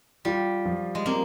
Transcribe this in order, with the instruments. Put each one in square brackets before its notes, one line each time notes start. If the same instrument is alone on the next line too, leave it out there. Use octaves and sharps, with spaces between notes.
[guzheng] G3 [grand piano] F4
[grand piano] F3
[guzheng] G#3
[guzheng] A#3 [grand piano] C4